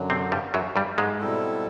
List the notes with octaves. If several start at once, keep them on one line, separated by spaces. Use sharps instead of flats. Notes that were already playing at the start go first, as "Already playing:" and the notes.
Already playing: F#2 D3 F#3
C3 C4
G2 G3
F#2 F#3
G2 G3
G#2 G#3
B2 G3 C4 E4 A4